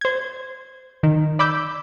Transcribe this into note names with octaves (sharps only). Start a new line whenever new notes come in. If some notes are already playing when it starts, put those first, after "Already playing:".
C5 G#6
D#3
D5 B5 D6 E6 G6